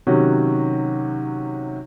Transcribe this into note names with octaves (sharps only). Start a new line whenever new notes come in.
C3 D#3 F#3 C#4 F#4